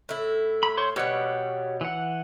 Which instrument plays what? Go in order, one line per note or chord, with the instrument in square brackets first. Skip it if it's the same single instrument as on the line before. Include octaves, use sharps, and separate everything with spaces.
[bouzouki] A2 E4
[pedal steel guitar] B5
C5 C#5 C6
[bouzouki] B2 G3 [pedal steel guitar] G4 C#5 F#5
[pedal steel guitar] E3 F#5